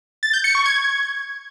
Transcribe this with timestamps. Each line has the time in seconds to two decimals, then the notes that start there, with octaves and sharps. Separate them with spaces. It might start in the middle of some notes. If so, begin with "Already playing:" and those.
0.23 A6
0.33 G6
0.44 C#7
0.55 C#6
0.66 G#6